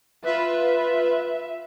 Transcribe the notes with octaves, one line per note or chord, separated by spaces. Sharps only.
F4 B4 E5